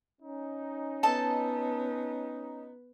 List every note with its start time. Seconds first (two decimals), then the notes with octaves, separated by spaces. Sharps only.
0.21 C#4 D#4
1.03 B3 A4 D#5 A5